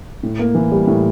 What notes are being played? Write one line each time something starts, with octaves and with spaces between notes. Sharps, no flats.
A2
A#3
E3
G3
A2